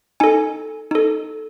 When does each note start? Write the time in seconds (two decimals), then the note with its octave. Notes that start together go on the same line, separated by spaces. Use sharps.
0.20 D#4 A4 G#5
0.91 D#4 A4